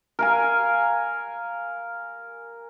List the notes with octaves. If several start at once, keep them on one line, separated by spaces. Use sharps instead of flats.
A#4 F5 G#5